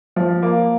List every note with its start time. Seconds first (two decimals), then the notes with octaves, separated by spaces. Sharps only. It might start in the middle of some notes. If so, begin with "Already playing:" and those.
0.16 F3
0.42 A#3